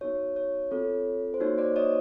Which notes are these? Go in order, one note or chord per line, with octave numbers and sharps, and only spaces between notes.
B3 D#4 F#4 C#5
C#5
C4 F4 A4 C#5
C5
A#3 D#4 F#4 C#5
C5 D5
C#5 D#5